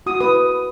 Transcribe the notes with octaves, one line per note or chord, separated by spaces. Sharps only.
F#4 D#6
B4 D#6